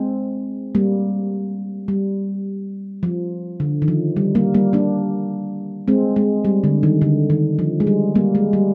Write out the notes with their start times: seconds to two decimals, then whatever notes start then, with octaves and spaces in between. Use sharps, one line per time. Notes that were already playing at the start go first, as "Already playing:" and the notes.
Already playing: G#3 C4
0.75 G3 A#3
1.88 G3
3.03 F3
3.60 D3
3.82 D#3
3.88 F3
4.16 G3
4.35 G3 A#3
4.54 G3 A#3
4.73 A#3 D4
5.88 G#3 C4
6.16 G#3
6.45 G3
6.64 D3
6.83 D#3
7.02 D3
7.30 D#3
7.59 F3
7.80 G#3
7.87 G3
8.15 G3 A#3
8.35 G#3
8.53 G3